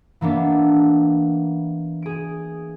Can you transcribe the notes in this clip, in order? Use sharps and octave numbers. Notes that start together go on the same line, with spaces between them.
E3 A#3 B3 D4
G#4 D7